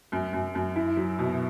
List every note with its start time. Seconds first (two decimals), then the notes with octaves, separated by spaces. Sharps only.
0.12 F#2
0.33 F#2
0.55 F#2
0.76 E4
0.97 F#3
1.19 B2